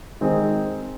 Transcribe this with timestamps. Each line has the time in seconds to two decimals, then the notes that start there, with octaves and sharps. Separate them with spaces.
0.21 D#3 G#3 C4 D#4 G#4